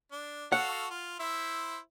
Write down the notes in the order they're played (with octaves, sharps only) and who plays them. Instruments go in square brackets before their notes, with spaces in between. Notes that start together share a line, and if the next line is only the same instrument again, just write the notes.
[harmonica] D4
[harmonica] F#4 A4 F5 [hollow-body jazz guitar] F#5
[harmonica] F4
E4 C5 E5